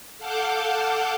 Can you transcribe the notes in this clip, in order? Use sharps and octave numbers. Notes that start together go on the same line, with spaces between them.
A4 F5 F#5 A5 D6 G6